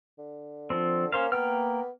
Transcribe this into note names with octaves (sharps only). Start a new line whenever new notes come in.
D3
F3 C4
A#3 C#4 C5 F5
A#3 B3 G5 F6